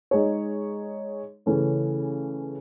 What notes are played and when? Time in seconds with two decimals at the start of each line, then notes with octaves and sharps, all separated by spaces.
0.11 G#3 D#4 G#4 C#5
1.46 C#3 E3 A3 C#4